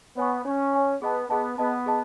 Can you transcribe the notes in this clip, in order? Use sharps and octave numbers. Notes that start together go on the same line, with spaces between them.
B3 C#5 G#5 C#6
C#4 C#5 G#5 C#6
C#5 G#5 C#6
B3 G#4 D#5 A5
B3 G#4 D#5 A5
B3 G#4 D#5 A5
G#4 D#5 A5